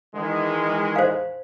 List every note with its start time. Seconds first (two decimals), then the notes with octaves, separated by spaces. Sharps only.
0.14 D#3 E3 G#3
0.96 C5 F5